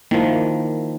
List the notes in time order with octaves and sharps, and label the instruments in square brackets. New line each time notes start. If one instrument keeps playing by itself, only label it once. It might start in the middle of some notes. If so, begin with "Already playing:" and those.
[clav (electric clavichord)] D#3 F3 [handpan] A#3 E4